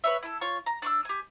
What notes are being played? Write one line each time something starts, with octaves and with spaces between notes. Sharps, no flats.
B4 C#5 E5
E4 A4
F4 C#5 C#6
A#5
D4 C#6 E6
G4 G#5